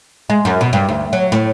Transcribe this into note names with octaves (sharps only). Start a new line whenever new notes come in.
G#3
F#2
B2
G2
D2
F#3
A2